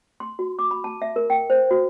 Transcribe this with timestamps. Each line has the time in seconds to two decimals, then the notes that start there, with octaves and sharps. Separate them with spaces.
0.20 C6
0.39 F#4
0.59 D6
0.71 B5
0.84 A5
1.02 E5
1.16 A#4
1.30 G5
1.50 C5
1.71 F#4